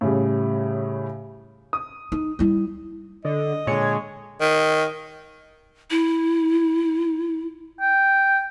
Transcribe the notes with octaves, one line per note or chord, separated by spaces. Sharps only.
A2 C#3 G3
D#6
D#4
G3 E4
D3 D#5
A#2 D3 G#3 C#5
D#3
E4
G5